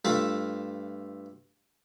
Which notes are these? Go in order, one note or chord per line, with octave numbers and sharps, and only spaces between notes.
G2 A3 F4 E5 A5